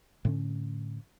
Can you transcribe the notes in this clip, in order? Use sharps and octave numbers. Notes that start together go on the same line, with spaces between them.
A2 D3 C#4